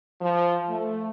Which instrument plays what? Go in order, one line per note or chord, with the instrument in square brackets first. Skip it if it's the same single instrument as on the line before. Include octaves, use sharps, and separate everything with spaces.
[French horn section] F3
A3